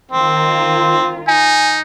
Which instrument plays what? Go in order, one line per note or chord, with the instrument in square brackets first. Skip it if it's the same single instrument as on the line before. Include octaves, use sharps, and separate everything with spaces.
[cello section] D#3 F4 [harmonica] C4
[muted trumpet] D#4 [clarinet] G#5